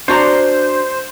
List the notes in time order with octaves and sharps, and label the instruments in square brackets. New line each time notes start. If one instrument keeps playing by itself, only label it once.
[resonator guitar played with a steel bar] D4 F#4 A#5 [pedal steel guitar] C5